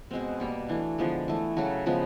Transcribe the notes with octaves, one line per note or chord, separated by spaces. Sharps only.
B2 G#3 B3 C4
B2 G3 A#3
E3 A3 D4
D3 F3 G#3 B3
E3 A3
C#3 F#3 A3 F#4
C#3 F3 G#3 B3